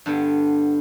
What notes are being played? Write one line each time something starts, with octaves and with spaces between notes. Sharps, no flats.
G2 D3 B3 A5